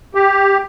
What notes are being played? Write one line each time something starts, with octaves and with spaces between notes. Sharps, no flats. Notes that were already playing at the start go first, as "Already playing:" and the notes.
G4